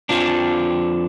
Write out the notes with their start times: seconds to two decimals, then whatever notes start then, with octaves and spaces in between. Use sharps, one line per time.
0.09 F2 F3 D4